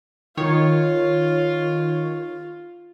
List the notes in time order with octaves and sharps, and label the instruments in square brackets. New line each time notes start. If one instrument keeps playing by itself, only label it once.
[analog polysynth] D#3 C#5 [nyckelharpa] F4